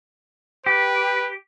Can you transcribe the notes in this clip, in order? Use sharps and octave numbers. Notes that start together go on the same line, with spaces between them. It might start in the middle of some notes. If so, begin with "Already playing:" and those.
G4 B4